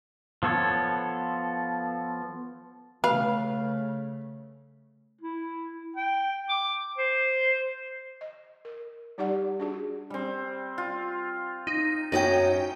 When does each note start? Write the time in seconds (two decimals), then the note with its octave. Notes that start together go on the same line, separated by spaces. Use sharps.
0.43 F3 B3 A4 C#5
3.04 C#3 A3 B4 F5
5.21 E4
5.96 G5
6.49 D6
6.98 C5
8.21 D#5
8.65 A#4
9.18 G3 D#4 G4 D5 F#5
9.60 D4 F#4 G#4
10.10 G3 C4
10.78 F4
11.67 D#4
12.12 F#2 F#3 C#4 D#4 G5